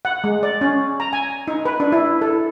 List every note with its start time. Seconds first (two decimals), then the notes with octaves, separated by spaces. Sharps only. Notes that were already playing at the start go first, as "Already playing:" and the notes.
0.05 F#5
0.24 G#3
0.43 D5
0.61 C#4
1.00 A#5
1.13 G#5
1.48 D#4
1.65 B4
1.80 D4
1.92 E4
2.21 A4